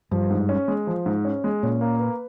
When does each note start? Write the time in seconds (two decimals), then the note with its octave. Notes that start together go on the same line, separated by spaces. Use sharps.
0.11 G2 F3
0.30 G#2
0.49 C#4
0.68 G#3
0.87 F3
1.06 G#2
1.25 C#4
1.44 G#3
1.63 A#2 C#4
1.81 A#3
1.99 B4